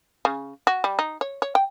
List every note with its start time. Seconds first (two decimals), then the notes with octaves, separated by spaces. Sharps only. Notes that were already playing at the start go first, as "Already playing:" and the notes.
0.25 C#3
0.67 F#4
0.84 G3
0.99 D#4
1.21 C#5
1.42 C#5
1.55 G5